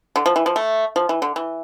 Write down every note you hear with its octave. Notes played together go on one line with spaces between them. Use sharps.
D3
F3
E3
F3
A3
F3
E3
D3
E3